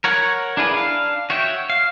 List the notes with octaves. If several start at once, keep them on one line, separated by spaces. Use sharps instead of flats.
A#4 C#5 F#5
D4 E4 G#4 A#4 B4
D4 F5
F#4 C#5 E5 G5
F5